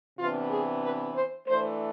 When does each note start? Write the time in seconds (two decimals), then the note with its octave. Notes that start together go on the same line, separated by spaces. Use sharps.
0.19 C3 E3 B3 D4 F4
0.51 G#4
0.83 B4
1.15 C5
1.47 E3 A3 D4 C5